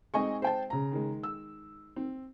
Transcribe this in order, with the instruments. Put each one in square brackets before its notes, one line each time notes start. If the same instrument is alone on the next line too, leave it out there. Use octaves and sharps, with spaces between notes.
[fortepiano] G#3 C4 D#4 [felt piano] D#5 G#5 C#6
[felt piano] C5 G5 A5
C#3 A#5
[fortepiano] D#3 G#3
[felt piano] E6
[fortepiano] C4